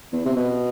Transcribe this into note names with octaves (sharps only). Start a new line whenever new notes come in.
E2
C3
B2